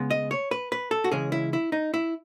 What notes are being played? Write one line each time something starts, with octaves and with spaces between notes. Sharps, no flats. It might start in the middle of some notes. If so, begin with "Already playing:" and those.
Already playing: C#3 G#3 B3
D#5
C#5
B4
B4
A4
F#4
C#3 E3 G#3 C#4 G#4
E4
E4
D#4
E4